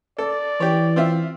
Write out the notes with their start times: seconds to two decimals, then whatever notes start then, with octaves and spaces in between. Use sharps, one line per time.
0.18 A4 D5
0.60 E3 G4 C#5
0.96 C4 F4 E5